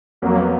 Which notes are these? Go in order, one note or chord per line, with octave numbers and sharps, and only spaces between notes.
F2 F#3 A#3
B3